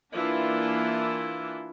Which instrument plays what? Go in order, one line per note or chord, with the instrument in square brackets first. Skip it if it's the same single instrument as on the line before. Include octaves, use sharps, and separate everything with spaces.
[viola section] E3 A#3 D4 E4 F4